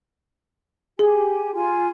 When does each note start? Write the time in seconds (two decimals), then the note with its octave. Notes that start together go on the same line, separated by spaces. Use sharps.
0.99 G4 G#4 G#5
1.54 F4 G#5 C6